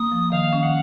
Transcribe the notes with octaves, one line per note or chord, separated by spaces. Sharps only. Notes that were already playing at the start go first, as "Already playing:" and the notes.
Already playing: A#3 D#6
F3
D#3 F5
C#4
F#5